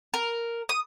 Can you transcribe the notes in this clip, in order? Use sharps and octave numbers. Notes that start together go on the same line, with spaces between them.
A#4
D#6